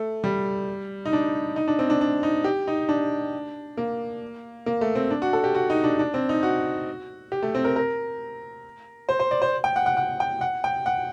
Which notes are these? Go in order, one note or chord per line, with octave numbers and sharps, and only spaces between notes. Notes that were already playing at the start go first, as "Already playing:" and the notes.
Already playing: A3
G3
D#4
D4
D#4
D4
C4
D4
D4
D#4
G4
D#4
D4
A#3
A#3
A3
C4
D4
F#4
A4
G4
F#4
D#4
D4
D4
C4
D#4
F#4
G4
A3
C4
A#4
A#4
C5
C5
D5
C5
G5
F#5
F#5
F#5
G5
F#5
G5
F#5